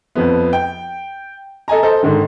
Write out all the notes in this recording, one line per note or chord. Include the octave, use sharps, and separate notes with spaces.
F2 F3 B3
G5
A4 D#5 G#5 A#5
A4 C5 D#5
G#2 D3 D#3